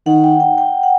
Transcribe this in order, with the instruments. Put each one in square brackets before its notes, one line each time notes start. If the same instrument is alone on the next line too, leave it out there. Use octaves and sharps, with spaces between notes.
[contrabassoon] D#3 [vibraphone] F#5
[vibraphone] G5
G5
G5
F#5